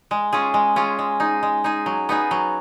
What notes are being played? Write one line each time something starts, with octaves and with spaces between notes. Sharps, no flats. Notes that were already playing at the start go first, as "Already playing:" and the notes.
G#3
C#4 F4 G#4
G#3
C#4 F4 G#4
G#3
D#4 G#4
G#3
D#4 G#4
F#3
B3 D#4 G#4
F#3